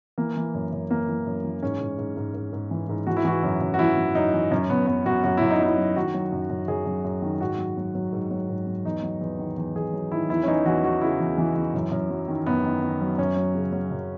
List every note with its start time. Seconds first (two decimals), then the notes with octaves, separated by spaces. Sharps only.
0.18 E3 A#3
0.37 E3
0.54 F#2
0.73 F#2
0.90 E3 A#3
1.09 E3
1.27 F#2
1.44 E3
1.63 G#2 C#4
1.80 G#2
1.98 G#2
2.17 G#2
2.34 G#2
2.53 G#2
2.71 E3
2.89 G#2
3.07 E3 F#4
3.17 E4
3.25 E3 F#4
3.43 F#2
3.61 F#2
3.74 F#4
3.79 E3 E4
3.97 E3
4.15 F#2 D#4
4.34 E3
4.51 F#2 C#4
4.70 F#2 B3
4.87 F#2 B3
5.06 F#2 F#4
5.24 F#2 F#4
5.37 F#2 E4
5.51 D#4
5.60 F#2 E4
5.78 F#3
5.96 D#3 F#4
6.14 F#3
6.32 F#2
6.50 F#2
6.68 F#2 G#4
6.86 F#2
7.05 F#2
7.22 D#3
7.41 G#2 F#4
7.58 F#3
7.77 F#3
7.95 F#3
8.13 G#2
8.31 F#3
8.49 G#2
8.67 F#3
8.85 E2 D#4
9.03 F#3
9.21 E2
9.39 D#3
9.58 E2
9.75 E2 G#4
9.93 F#3
10.11 D#3 E4
10.29 E2 E4
10.43 C#4
10.48 E3 D#4
10.66 E2 F#4
10.84 E2 F#4
11.01 C#3 E4
11.20 E2
11.38 E3
11.56 E3
11.74 F#2
11.92 F#2
12.10 F#3
12.28 D#3
12.46 F#2 B3
12.65 D#3
12.83 D#3
13.01 F#3
13.18 F#2 C#4
13.37 F#3
13.55 C#3
13.73 F#3
13.91 F#2